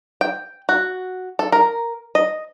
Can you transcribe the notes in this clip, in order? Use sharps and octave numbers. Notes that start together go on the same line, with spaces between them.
G5
F#4
A4
A#4
D#5